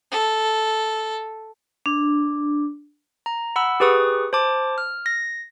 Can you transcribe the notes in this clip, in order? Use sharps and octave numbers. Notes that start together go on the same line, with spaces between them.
A4
D4
A#5
F#5 B5 E6
G4 G#4 B4 C#6 D#6
C5 A5 D6
F6
A#6